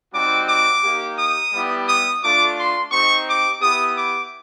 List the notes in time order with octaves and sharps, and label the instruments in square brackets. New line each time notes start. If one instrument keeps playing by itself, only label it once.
[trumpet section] G3 C4 D#4 F#4 D6
D6
A#3 D#4 G4
D#6
G3 B3 E4 G4
D#6
A3 D4 F4 D6
C6
C4 D#4 G4 C#6
D6
B3 E4 G4 D#6
D6